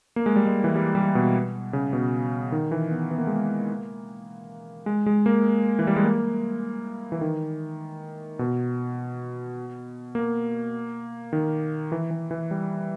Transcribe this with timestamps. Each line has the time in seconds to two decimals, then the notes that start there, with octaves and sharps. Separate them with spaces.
0.16 A#3
0.26 G#3
0.36 G3
0.46 G#3
0.64 E3
0.76 G3
0.95 G3
1.15 B2
1.73 C#3
1.93 B2
2.52 D#3
2.71 E3
2.91 B3
3.11 B3
3.18 A#3
3.27 G#3
3.34 A#3
4.86 G#3
5.06 G#3
5.26 A#3
5.79 E3
5.87 G3
5.96 G#3
6.04 A#3
7.12 E3
7.21 D#3
8.39 B2
10.15 A#3
11.33 D#3
11.92 E3
12.11 E3
12.31 E3
12.51 G3